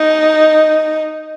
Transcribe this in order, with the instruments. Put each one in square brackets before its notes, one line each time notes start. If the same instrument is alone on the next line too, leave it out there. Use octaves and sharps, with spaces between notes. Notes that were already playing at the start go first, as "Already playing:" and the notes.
Already playing: [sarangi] D#4